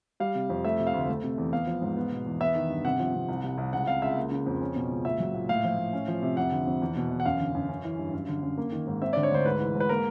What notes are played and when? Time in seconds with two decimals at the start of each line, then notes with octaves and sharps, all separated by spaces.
0.20 G3 F5
0.35 C3
0.50 F2
0.65 A3 E5
0.79 C3
0.87 F5
0.94 D2
1.09 A3
1.23 C3
1.38 E2
1.53 B3 F5
1.67 F3
1.82 G#2
1.97 B3
2.12 B2
2.26 E2
2.40 B3 E5
2.55 D#3
2.70 G2
2.85 C3 F#5
2.99 F3
3.15 C3
3.29 C2
3.44 C3
3.58 C2
3.73 C#2 F#5
3.87 C3 F5
4.02 C#2 E5
4.17 A#3
4.31 C#3
4.46 F2
4.61 C#4
4.76 B2
4.90 C#2
5.05 A#2 E5
5.20 F#3
5.34 A#2
5.49 A2 F5
5.64 F3
5.79 A2
5.93 C#4
6.08 F3
6.22 C3
6.37 F2 F#5
6.52 D3
6.67 F2
6.82 E2
6.96 B2
7.11 E2
7.20 F#5
7.25 F#2 F5
7.40 D3
7.55 F#2
7.69 C#4
7.84 E3
7.99 G2
8.14 F#2
8.28 D3
8.43 F#2
8.58 A#3
8.72 D#3
8.87 G#2
9.01 C4 E5
9.13 D3 D5
9.23 C#5
9.31 D2 C5
9.46 G#2 B4
9.60 E3
9.75 G#2
9.80 B4
9.89 A#3 A#4